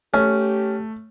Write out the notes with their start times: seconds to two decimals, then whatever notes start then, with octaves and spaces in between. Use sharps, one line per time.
0.14 A3 C#4 G4